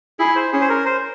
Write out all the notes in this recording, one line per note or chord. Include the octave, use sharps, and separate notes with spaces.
E4 G#4
C5
C#4 G#4
C5
A#4
C5